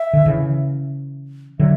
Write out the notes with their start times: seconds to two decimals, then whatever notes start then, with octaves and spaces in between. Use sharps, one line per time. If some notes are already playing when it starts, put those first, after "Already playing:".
Already playing: E5
0.13 D3
0.26 C#3 E3
1.59 D3 F#3 E5